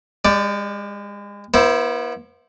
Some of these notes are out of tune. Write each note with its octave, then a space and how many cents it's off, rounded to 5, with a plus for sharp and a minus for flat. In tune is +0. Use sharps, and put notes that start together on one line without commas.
G#3 -35 G4 +0 D5 +0
B3 -40 E4 +0 C5 +0